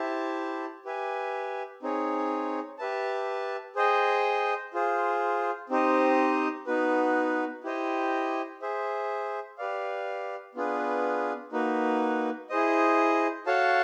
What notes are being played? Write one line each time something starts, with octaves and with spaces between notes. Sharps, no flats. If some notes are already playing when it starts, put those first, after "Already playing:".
Already playing: E4 G4 C5 E5 A5
G4 B4 E5 G#5
C4 D#4 G#4 C#5
G4 B4 E5 A5
G#4 C5 D#5 G5
F4 G#4 C5
C4 D#4 G4 C5 D#5
B3 D#4 F#4 B4
E4 G4 C5 D#5 G5
G#4 C5 E5
G4 B4 D5 F5
B3 D4 F4 G#4 B4
A#3 D#4 F#4 B4
E4 G#4 C5 D#5
F#4 A4 C#5 F5 A5